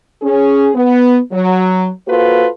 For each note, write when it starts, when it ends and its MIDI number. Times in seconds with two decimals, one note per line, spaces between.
0.22 0.70 61
0.22 0.70 68
0.75 1.19 59
1.32 1.90 54
2.08 2.47 58
2.08 2.47 65
2.08 2.47 66
2.08 2.47 69
2.08 2.47 71
2.08 2.47 72